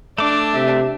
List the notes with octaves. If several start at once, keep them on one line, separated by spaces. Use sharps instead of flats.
A3 D4 D6
C3 E5